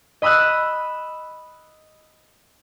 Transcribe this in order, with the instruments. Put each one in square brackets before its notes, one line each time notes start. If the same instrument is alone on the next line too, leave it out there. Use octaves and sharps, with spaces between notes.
[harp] D#5 B5 D#6 E6 F#6